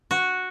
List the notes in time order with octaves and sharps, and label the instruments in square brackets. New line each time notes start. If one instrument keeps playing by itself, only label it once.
[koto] F#4